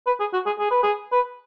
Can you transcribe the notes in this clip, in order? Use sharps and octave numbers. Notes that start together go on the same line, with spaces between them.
B4
G#4
F#4
G#4
G#4
B4
G#4
B4